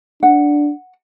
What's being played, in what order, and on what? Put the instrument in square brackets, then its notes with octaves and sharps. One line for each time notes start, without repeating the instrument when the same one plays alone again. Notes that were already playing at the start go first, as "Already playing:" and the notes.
[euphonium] D4 [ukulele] F#5